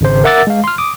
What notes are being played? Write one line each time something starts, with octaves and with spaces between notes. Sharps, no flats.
G#1 C#3 C5
A#4 E5 F#5 D6 E6 A6
G#3 F5
C6 F6
D6 D#6